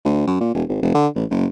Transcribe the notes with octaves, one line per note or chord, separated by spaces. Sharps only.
D2
F#2
A#2
E1
G#1
F1
D3
A1
F#1